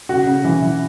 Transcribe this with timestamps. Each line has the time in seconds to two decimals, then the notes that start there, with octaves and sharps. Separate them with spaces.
0.09 C#3 F#4
0.27 C#3
0.44 E3
0.62 E3